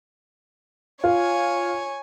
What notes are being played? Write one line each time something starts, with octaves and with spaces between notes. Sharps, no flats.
F4 C#5 G#5